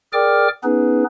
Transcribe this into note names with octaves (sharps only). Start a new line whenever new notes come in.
G#4 A#4 D5 G5 D6 F6
B3 C#4 D#4 G#4 B4